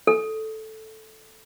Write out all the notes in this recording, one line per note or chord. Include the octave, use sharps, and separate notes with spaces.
A4